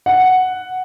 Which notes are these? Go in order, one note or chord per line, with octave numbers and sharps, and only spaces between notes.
F#5